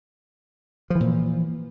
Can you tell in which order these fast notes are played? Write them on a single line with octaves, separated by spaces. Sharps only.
F3 E3 A#2